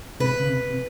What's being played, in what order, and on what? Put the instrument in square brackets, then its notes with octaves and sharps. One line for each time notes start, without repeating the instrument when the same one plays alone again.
[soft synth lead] C3 [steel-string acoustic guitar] B4
[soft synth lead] C#3
C3
C3